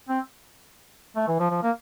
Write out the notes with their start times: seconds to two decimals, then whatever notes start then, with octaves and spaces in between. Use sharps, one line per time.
0.09 C4
1.16 A3
1.28 E3
1.40 F3
1.50 F3
1.63 A#3